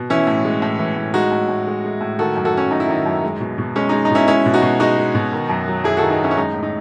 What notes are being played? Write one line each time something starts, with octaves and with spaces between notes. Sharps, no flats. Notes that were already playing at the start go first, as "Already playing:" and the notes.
Already playing: B2
E3 C#4 E4
A2
G#3
A2
E3
A2
G#3 D#4 F#4
A2
A2
G#3
G#3
A2
D#3 F#4 A4
F#2
F#4 A4
F#3 C#4
F#2 D#4
E4
D#3 D#4
F#2
G#3
B2
B2
G#3 C#4
G#3 D#4
D#4
B2 C#4 E4
G#3 C#4 E4
B2
D#4 F#4
B2
G#3 D#4 F#4
G#3
B2
D#3
F#2
F#3
F#2 E4 G#4
D#3 F#4 A4
D#4
F#2 C#4 E4
C#4
G#3 D#4
A2
D#4